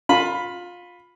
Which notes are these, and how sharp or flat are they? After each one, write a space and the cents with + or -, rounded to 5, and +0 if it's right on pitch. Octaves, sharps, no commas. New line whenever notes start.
F4 +20 B5 +0